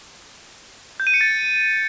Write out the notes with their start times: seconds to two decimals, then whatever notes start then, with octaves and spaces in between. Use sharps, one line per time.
1.00 G6
1.07 D#7
1.14 C#7
1.21 A6